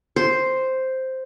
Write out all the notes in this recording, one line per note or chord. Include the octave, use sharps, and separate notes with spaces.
C5